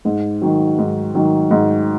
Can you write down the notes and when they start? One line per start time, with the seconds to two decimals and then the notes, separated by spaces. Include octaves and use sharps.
0.05 G#2
0.42 D#3 F#3
0.78 G#2
1.15 D#3 F#3
1.51 G#2